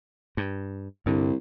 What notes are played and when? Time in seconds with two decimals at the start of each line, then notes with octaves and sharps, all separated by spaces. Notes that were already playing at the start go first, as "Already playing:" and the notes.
0.37 G2
1.06 C2 G2 D3